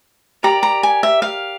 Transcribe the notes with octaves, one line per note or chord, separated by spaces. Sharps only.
G4 A#4 D5 A#5
A#5
G#5
E5
F5